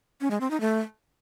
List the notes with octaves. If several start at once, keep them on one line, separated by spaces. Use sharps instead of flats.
C#4
G#3
C4
D#4
A3